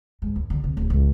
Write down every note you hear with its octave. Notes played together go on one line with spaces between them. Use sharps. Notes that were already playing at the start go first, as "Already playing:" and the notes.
G#2
D#2
D3
C3
D1
C#2